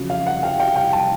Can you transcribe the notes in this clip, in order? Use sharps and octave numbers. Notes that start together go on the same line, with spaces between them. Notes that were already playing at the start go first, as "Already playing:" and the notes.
Already playing: F2 C#3 F#3
F5
F#5
F5 G5
F5 G5
F5 G5
G5 A5